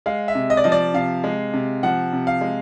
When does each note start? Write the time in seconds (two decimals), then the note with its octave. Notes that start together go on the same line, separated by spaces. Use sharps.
0.06 G#3 F5
0.28 E5
0.35 C3
0.50 D#5
0.57 D5
0.64 F3 D#5
0.72 D5
0.94 C3 F5
1.24 G#3
1.53 C3
1.83 F3 F#5
2.12 C3
2.27 F5
2.41 G#3